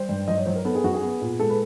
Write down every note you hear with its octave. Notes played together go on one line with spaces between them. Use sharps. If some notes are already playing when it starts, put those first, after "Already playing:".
Already playing: G3 C5
G2
F#3 D#5
C#5
F#3 C5
A#4
B3 A4
G#4
F#2 F#4
G#4
B3
A#2
G#3 A4
B4